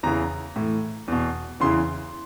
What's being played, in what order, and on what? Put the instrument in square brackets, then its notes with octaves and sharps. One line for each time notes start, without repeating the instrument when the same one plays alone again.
[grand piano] E2 C#3 E3 A#5
A2 E3
E2 B2
E2 C#3 E3 C6